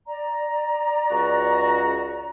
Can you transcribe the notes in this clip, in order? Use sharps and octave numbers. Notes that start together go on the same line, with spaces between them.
D5 A#5
C#2 F#4